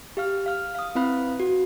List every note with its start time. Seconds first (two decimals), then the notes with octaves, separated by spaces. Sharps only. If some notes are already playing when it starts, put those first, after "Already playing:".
0.17 G4 F5 F6
0.46 F5 F6
0.75 F5 D#6
0.95 C4 E4 B4 F5 B5 F#6
1.40 F#4